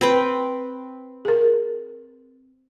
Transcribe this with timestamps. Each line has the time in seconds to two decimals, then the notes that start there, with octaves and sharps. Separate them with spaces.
0.01 C4 B4 G5
1.25 G#4 A#4